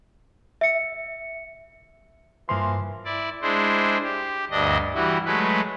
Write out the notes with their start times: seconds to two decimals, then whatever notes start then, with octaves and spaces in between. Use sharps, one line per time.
0.61 E5 C#7
2.49 G2 E3 F3 A#3 C6
3.05 E4 D5
3.42 G#3 D4 E4 C5
4.03 G4
4.51 D2 G2 D4 D#5
4.94 E3 G3 E4 F#4
5.26 F#3 G#3 A3 B4